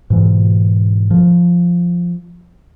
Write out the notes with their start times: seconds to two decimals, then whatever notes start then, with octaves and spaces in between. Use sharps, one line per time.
0.10 G#2 B2 E3
1.11 F3